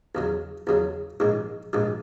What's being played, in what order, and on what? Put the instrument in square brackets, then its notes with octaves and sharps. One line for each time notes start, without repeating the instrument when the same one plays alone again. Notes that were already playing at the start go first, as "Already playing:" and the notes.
[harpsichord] E2 C#3 F#3
E2 C#3 F#3
A#1 G#2 D#3 G#3
A#1 G#2 D#3 G#3